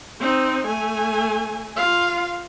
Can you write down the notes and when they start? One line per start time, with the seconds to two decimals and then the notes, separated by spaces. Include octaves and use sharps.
0.20 C4 D#4
0.67 A3 G#5
1.76 F4 F5